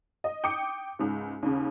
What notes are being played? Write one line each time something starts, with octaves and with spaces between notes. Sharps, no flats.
D#5
G5 D6 D#6 C#7
C#2 G#2
D#2 C#3